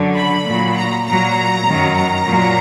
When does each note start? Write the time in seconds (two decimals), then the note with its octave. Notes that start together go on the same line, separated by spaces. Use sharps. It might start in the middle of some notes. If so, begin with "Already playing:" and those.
Already playing: F#2 D3 F#3
0.17 B5
0.46 A#2 F#3
0.77 A#5
1.06 A#2 F#3 A#5
1.66 F#2 D#3 F#3
1.95 A#5
2.25 A#2 F#3